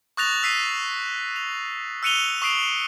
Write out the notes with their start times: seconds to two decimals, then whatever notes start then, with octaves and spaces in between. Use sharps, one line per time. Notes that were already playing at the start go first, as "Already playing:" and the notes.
0.17 C#6 D#6 F#6 A6 A#6 F7
0.43 E6 B6 C7 D#7
1.36 F7
2.03 E6 F#6 C#7 D#7 F7 G7
2.42 C#6 D#6 C7 D7 F7